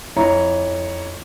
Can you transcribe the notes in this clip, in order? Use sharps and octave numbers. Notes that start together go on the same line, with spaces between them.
F2 E4 C#5 A#5